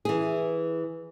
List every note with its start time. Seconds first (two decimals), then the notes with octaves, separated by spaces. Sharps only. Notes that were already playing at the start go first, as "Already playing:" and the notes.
0.05 E3 G#4